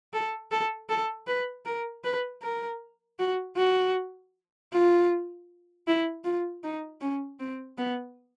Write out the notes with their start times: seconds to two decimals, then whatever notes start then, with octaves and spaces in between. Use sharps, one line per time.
0.13 A4
0.51 A4
0.89 A4
1.27 B4
1.66 A#4
2.04 B4
2.43 A#4
3.19 F#4
3.57 F#4
4.72 F4
5.87 E4
6.24 F4
6.64 D#4
7.01 C#4
7.40 C4
7.78 B3